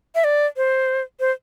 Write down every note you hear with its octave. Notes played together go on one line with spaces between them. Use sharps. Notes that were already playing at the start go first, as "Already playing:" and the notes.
E5
D5
C5
C5